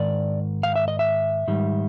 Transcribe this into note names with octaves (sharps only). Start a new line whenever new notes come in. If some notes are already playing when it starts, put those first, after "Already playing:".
Already playing: G#2 D#3 D5
F5
E5
D#5
E5
G#2 D#3 G3